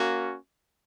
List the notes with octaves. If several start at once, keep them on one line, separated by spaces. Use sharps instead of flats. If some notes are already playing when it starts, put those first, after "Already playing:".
Already playing: A#3 C#4 F#4